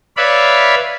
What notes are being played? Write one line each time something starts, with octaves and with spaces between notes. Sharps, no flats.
B4 C#5 D5 E5 F5 B5